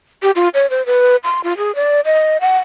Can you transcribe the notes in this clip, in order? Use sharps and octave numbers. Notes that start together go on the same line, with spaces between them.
G4
F4
C#5
C5
B4
C6
F4
G#4
D5
D#5
F#5